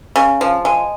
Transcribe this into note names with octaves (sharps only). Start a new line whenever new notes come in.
C#3
F3
G#3